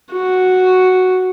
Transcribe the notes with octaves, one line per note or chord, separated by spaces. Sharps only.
F#4